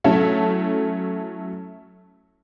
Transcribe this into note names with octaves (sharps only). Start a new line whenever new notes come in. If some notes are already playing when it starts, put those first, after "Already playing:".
F#3 A3 C#4 E4 A4